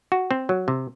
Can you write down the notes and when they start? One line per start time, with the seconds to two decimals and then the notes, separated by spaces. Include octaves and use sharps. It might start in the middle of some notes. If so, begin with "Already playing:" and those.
0.12 F#4
0.31 C4
0.49 F#3
0.68 C3